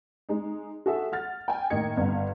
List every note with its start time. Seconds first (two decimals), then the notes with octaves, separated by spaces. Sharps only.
0.29 G#3 D#4
0.86 F#4 G#4 A4 E5
1.12 F#5 F6 A6
1.48 G5 G#5
1.70 A2 D#3 A#3 D#5 G#6 C#7
1.97 G1 F5